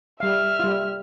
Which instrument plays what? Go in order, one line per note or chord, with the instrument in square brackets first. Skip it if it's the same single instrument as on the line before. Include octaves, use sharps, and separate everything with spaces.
[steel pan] G3 F5 [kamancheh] E5 F6
[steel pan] G3 F4